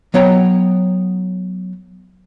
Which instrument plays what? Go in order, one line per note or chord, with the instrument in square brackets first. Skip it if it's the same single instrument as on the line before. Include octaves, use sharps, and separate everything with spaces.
[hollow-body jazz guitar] F#3 B3 C#5 G5 A#5